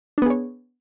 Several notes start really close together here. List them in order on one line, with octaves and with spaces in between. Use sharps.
D4 B3 G#4 C#5